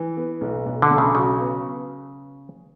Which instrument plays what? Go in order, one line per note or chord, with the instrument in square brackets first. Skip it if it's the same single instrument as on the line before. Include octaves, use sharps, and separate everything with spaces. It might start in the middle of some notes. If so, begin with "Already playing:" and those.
Already playing: [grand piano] E3
B3
B1
B1
[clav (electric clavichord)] D3
[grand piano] B1
[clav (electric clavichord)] C#3
[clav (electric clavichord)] C#3 [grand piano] F#3
[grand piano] B3